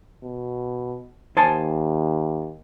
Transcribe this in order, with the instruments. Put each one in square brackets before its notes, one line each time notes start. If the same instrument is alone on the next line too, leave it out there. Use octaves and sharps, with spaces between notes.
[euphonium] B2
[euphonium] D#2 [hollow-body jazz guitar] C5 G#5 A5